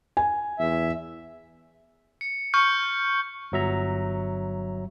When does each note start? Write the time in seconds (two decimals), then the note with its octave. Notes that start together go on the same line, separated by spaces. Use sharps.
0.17 G#5
0.59 E2 E5
2.21 C#7
2.54 C#6 F6 G6 C#7
3.52 G1 F#3 E5 A#5